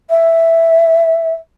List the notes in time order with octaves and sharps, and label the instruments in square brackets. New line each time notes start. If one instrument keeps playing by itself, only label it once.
[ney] E5